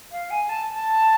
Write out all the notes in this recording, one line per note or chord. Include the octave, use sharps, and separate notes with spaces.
F5
G#5
A5
A5